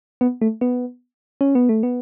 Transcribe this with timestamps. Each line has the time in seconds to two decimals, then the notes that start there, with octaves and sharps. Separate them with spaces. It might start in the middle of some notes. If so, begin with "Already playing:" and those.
0.21 B3
0.41 A3
0.61 B3
1.41 C#4
1.55 B3
1.69 A3
1.83 B3